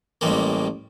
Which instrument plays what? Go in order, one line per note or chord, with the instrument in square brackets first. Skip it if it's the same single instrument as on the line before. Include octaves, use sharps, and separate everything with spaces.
[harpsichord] A1 G3 G#3 A#3